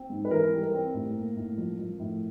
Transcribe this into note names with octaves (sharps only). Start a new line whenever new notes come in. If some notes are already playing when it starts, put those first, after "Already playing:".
Already playing: C4
G#2
B4
E3 A#4
G3
A#4
C4
A2
A#3
A2
F3
F3
A2